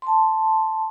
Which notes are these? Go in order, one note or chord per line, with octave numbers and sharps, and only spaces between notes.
A5 C6